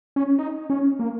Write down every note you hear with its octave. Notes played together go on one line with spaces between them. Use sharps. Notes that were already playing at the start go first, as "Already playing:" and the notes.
C#4
D#4
C#4
A#3